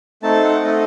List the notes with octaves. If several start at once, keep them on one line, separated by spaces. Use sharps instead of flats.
A3 C4 D#4 A4 A5
F#5
A3 C4 D#4 A4 D#5